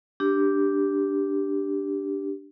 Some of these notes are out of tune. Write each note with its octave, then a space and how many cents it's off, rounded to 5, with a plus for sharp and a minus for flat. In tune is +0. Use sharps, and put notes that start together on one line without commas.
D4 -5 G4 +0